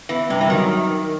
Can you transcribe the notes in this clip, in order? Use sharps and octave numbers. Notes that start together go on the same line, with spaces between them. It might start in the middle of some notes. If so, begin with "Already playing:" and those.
E3 B3
G2 C3
E3
D#3 F#3